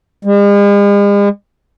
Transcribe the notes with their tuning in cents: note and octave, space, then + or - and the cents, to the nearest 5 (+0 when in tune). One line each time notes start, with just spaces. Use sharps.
G#3 -45